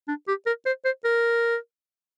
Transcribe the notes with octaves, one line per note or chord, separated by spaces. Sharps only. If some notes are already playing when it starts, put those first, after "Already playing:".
D4
G4
A#4
C5
C5
A#4